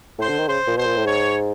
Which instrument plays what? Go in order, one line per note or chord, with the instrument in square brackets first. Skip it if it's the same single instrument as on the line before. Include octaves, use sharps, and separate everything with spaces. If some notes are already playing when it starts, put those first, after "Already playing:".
[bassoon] A2 [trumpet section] C5
[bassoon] D3
D#3
[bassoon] C#3 [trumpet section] C5
[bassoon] A#2
[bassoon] B2 [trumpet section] C5
[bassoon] A#2
A2
[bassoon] G#2 [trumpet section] C#5